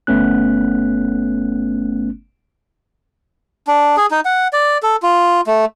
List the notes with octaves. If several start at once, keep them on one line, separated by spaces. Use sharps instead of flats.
G1 A3 B3 C#4 F#6
D4
G#4
D#4
F#5
D5
A4
F4
A3